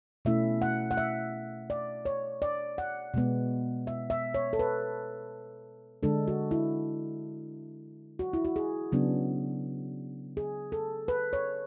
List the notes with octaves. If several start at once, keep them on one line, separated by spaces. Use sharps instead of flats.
B2 A3 C#4 E4 E5
F#5
F#5
E5
D5
C#5
D5
F#5
B2 G#3 B3
E5
E5
C#5
A4
B4
D3 G#3 D4 A4
F#4
E4
F#4
E4
F#4
G#4
C#3 F#3 B3 D4
G#4
A4
B4
C#5